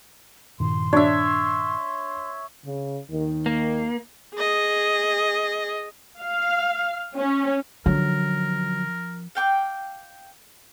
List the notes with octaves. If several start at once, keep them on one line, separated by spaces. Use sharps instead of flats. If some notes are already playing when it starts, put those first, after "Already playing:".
G2 A#2 D#3 C6
D4 C#5 E5
C#3
D#2 D#3
A#3
G#4 D#5
F5
C#4
D3 F3 F#3 C#4 A#4
F5 G5 C#6 D6